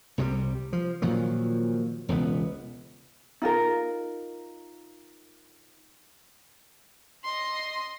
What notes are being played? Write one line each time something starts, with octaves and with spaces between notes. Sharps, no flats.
C2 C3 F#3 G3
F3
A#2 D#3 F3 F#3
E1 C#2 C#3 B3
D#4 F4 A#4
D#5 C6